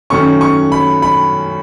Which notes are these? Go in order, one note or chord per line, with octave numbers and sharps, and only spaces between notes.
F#2 D#3 A3 C#4 C#6
C#6
B5
B5